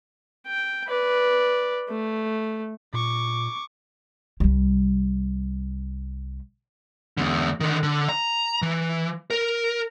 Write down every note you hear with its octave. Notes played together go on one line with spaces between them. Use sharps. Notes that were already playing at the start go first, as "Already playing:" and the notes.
G5
B4 D5
A3
A#2 C#6 D6
C2 G3
E2 D3
D3 D#3
D3
A#5
E3
A#4